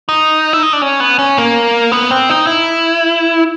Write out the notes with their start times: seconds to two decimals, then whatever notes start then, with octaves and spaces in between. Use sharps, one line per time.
0.09 D#4
0.53 E4
0.63 D#4
0.73 D4
0.82 C#4
1.00 B3
1.19 C#4
1.38 A#3
1.92 B3
2.11 C4
2.29 D#4
2.47 E4